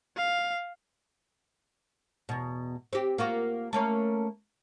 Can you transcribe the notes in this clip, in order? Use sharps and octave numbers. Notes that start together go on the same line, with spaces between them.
F5
E2 B2
C4 G4
A#3 F4 F#4
A3 A#3 C#4